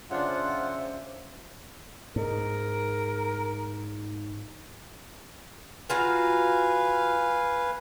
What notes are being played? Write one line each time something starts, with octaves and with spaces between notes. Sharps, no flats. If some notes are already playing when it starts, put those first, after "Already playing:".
C#3 D4 F4 C5 E5 F#5
G#2 A#4
F4 F#4 B4 F5 G#5 A#5